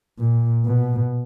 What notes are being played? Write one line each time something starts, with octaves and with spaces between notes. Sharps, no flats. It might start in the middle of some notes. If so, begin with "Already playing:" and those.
A#2
B2